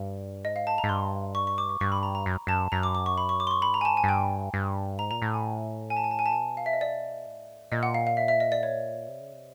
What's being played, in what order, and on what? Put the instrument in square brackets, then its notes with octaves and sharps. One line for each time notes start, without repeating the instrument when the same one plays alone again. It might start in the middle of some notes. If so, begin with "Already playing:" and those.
Already playing: [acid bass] G2
[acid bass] G#2 [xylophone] D#5
[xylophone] F5
A5
A#5
[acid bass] G#2
[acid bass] G2 [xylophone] C6
[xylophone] C#6
C#6
D6
C#6
[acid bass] G2 [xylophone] C#6
[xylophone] B5
A#5
A#5
[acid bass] F#2
[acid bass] F#2 [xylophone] A5
[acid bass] F#2 [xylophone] A#5
[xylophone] D6
D6
C#6
B5
C#6
D6
C6
C#6
[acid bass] G2 [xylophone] B5
[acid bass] G#2 [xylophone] A#5
[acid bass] G2 [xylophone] G#5 A5
[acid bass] G#2 [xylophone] G#5
[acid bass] G2
[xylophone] G5
[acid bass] G2
[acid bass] G#2 [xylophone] A#5
[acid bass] A#2 [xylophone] A#5
[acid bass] A2 [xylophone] A5
[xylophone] G#5
G#5
A5
G#5
A5
G#5
A5
[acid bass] A#2
[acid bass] B2 [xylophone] G#5
[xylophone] F5
E5
D#5
D5
[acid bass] A2
[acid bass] A#2 [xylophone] D#5
[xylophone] F#5
F5
F5
E5
E5
D#5
D5
C#5
[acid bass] C3
C#3
C3